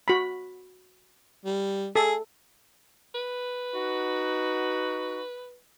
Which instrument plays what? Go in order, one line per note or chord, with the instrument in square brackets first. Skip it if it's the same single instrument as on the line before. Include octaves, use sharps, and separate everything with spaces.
[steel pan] F#4 B5
[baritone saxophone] G3
[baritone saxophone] G#4 [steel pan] A4
[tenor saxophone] B4
[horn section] D#4 F#4